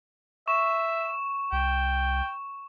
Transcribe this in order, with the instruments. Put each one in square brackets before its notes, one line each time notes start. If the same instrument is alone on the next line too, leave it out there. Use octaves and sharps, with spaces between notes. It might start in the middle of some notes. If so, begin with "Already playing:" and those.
[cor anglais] E5 [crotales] C#6 E7
[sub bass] C2 [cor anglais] G5